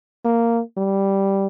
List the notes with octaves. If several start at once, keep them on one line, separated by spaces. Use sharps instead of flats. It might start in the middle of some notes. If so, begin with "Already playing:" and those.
A#3
G3